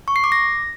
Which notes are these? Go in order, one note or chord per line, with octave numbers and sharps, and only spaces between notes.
C#6
C7
D6
A#6